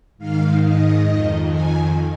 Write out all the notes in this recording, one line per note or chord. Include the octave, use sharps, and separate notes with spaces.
G#2 D#3 F5
D#5
F2 D#3
G#5